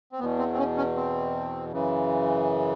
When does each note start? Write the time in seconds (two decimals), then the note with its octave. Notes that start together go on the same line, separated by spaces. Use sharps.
0.12 C4
0.19 E2 B3
0.23 B2
0.39 C4
0.53 C4
0.58 C#4
0.77 C#4
0.96 C4
1.72 F#2 C#3 E3